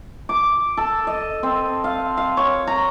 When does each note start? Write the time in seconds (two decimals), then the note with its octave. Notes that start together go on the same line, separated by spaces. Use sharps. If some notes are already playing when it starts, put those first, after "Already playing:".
0.29 D6
0.77 A4
1.07 D#5
1.43 C4
1.84 F5
2.17 F5
2.37 C#5
2.67 A#5